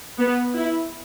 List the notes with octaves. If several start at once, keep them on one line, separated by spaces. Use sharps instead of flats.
B3
E4